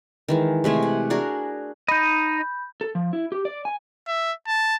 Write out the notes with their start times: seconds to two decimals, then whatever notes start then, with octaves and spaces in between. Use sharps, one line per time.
0.28 D#3 E3 G#3
0.64 C3 G#3 A3 G#5
0.83 F#5
1.10 D4 F#4 G#4 A#4
1.88 D#4 D#5 B5 G6
2.81 A4
2.95 F3
3.13 E4
3.32 G4
3.45 D5
3.65 G#5
4.07 E5
4.48 A5